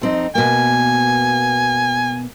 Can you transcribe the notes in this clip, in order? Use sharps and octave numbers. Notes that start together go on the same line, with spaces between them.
F2 C4 D#4
B2 A#3 G#5